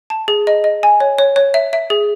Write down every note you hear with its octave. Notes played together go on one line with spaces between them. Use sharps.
A5
G#4
D#5
D#5
G#5
C#5
C#5
C#5
E5
E5
G#4